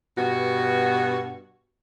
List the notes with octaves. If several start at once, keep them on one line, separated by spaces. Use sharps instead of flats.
G2 B2 F#4